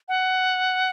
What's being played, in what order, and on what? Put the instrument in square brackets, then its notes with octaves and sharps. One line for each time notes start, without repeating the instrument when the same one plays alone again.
[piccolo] F#5